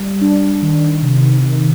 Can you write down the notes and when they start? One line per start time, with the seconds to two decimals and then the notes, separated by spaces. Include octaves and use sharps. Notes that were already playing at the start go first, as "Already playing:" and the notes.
Already playing: G3
0.21 D4
0.62 D#3
1.02 C3
1.42 D#3